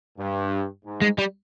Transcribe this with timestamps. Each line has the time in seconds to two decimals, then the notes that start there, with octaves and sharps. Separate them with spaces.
0.18 G2
0.85 G#2
1.02 G#3
1.19 G3